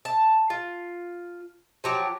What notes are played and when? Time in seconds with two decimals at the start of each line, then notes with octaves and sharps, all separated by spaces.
0.05 A5
0.50 F4
1.84 F3 F#3 G4